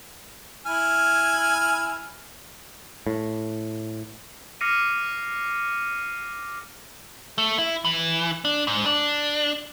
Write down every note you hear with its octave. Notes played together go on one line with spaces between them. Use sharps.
E4 G#5 F6
A2
D6 F6 A#6 C7 C#7 D#7
A3
E4
E3
D4
G#2
D4